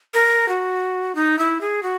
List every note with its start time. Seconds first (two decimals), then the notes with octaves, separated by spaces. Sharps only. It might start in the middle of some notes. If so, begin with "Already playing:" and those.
0.14 A#4
0.48 F#4
1.15 D#4
1.39 E4
1.61 G#4
1.83 F#4